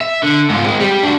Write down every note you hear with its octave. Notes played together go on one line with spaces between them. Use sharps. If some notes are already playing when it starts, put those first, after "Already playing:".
E5
D3
G#2 F4
G#3 C4
G3 G4
D4 F#4